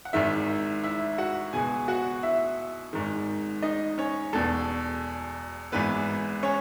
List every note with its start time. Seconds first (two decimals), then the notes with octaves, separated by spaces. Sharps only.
0.05 F#5
0.13 G#1 G#2 D#3 E4 E5
0.83 E4 E5
1.18 F#4 F#5
1.53 C#2 B2 G#4 G#5
1.88 F#4 F#5
2.23 E4 E5
2.93 G#1 G#2 D#3
3.63 D#4 D#5
3.98 C#4 C#5
4.33 E1 E2 B2 A4
5.72 G#1 G#2 E3 B3 B4
6.43 C#4 C#5